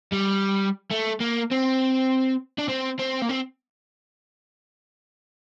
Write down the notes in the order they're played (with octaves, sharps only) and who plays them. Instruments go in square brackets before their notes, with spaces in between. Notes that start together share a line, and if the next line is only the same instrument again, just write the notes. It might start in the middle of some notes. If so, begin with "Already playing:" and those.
[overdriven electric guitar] G3
A3
A#3
C4
D4
C4
C4
A#3
C4